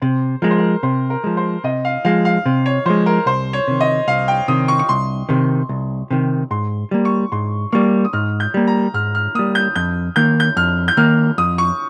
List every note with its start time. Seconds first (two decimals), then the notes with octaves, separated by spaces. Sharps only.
0.02 C3 C5
0.42 F3 G#3 A#4
0.51 C5
0.59 A#4
0.83 C3 C5
1.10 A#4
1.24 F3 G#3
1.37 C5
1.64 C3 D#5
1.85 F5
2.05 F3 G#3 F5
2.25 F5
2.46 C3
2.66 C#5
2.86 F3 G#3 C5
3.06 A#4
3.26 C2 C5
3.53 C#5
3.68 C3 D#3
3.81 D#5
4.07 C2 F5
4.28 G5
4.48 C3 D#3 D#6
4.68 C#6
4.79 C#6
4.89 C2 C6
5.29 C3 D#3
5.69 C2
6.11 C3 D#3
6.51 G#2 C6
6.91 G3 A#3
7.05 C#6
7.32 G#2 C6
7.72 G3 A#3 C#6
8.05 D#6
8.13 G#2 F6
8.40 G6
8.54 G3 A#3
8.67 A#5
8.94 G#2 F6
9.15 F6
9.35 G3 A#3 D#6
9.55 G6
9.76 F2 G6
10.16 D#3 A#3 G6
10.40 G6
10.56 F2 F6
10.88 G6
10.97 D#3 A#3 F6
11.38 F2 D#6
11.58 C#6